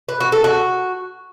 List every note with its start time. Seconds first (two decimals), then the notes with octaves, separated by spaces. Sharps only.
0.09 B4
0.20 F#4
0.32 A4
0.44 F#4